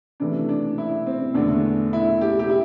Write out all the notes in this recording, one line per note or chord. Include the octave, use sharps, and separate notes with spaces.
C3 E3 A3 D4
D4
E4
C4
E2 D3 A3 D4
E4
G4
G4
E4